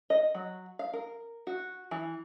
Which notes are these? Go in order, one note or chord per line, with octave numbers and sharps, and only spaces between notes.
D#5
F#3
F5
A#4
F#4
E3